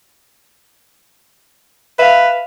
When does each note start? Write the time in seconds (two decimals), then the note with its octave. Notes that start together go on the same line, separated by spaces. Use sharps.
1.99 B4 E5 F5